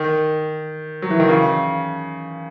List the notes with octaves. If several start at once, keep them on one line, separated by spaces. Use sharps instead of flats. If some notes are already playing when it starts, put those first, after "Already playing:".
Already playing: D#3
F#3
E3
D#3
C#3